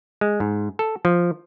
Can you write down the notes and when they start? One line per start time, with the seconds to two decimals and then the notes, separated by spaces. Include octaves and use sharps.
0.21 G#3
0.40 G#2
0.79 A4
1.05 F3